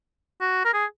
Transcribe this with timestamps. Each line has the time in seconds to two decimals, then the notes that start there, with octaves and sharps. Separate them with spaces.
0.41 F#4
0.65 A#4
0.74 G#4